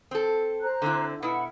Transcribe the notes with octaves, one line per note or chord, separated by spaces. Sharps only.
C4 A4
C5 A#5 F#6
D3 C4 E4
B2 E4 B4 F#5 B5